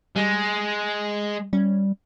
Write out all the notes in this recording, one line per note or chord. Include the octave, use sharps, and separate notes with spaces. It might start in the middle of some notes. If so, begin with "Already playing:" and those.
G3 G#3 D#5
G3 C#4